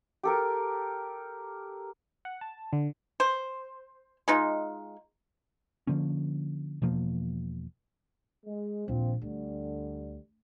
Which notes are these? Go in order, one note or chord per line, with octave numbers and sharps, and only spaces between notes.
G4 A4 A#4
F#5
A5
D3
C5
G#3 D#4 F4
D3 F3 A#3 C#4
E1 B2 F3 A#3
G#3
A#1 D#2 F3 C4
D2 D3 G3